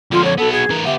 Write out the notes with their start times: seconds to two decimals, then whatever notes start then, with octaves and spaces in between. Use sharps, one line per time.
0.12 F2 D3 F4
0.24 C#5
0.38 F#3 B3 A4
0.52 G#4
0.70 E3 A#4
0.85 B3 G4 E5